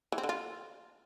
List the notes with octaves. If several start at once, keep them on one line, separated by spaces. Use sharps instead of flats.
E3
C4
D3
F4